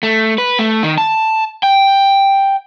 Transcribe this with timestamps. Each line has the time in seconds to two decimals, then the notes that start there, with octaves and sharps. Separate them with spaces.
0.03 A3
0.38 B4
0.59 A3
0.83 D#3
0.98 A5
1.63 G5